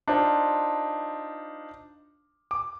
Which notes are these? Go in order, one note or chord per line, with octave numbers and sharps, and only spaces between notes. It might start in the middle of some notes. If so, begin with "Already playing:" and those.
D4 D#4 F4 C5 D#5
D6